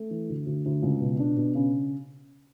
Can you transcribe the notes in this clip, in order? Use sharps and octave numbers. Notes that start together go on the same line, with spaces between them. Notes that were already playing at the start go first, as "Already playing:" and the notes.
Already playing: A3
E3
D2
D2
D2
C#2
B2
D4
B2
C#3